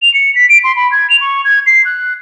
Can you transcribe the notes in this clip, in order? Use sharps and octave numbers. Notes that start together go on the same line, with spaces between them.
F7
C#7
B6
D7
C6
B5
G#6
F7
C#6
G#6
C7
F#6